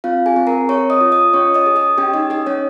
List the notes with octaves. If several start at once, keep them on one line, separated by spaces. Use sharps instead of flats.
C4 F4 F5
G#4 G#5
C4
A#4 A#5
G#4 C#5 C#6
D#5 D#6
F4
D#5 D#6
C#4 C#5 C#6
D#5 D#6
G#4
D#5 D#6
C#4 G4 G5
D#4 D#5
D#4 G#4 D#5
C#4 C#5